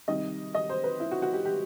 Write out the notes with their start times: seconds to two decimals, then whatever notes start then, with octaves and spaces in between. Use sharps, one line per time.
0.08 C3 D#3 G3 D#5
0.55 D#5
0.69 C5
0.84 B4
1.00 E4
1.11 F#4
1.22 F#4
1.33 G4
1.45 G4